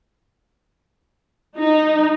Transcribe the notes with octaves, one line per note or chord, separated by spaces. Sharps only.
D#4